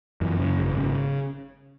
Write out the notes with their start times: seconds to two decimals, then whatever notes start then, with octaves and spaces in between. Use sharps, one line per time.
0.21 F#2 E3
0.39 C#3
0.59 G#1
0.77 C#3